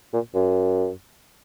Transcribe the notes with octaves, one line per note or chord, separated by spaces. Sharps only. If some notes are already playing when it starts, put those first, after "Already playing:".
A#2
F#2